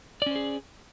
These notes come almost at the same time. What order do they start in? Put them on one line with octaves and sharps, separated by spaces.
D5 C#4 C5 G#4